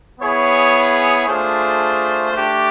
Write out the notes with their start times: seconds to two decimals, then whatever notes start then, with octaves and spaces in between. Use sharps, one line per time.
0.20 B3 E4 G#4 C#5
1.27 A3 D4 F4 G#4 C5
2.33 A3 D4 G4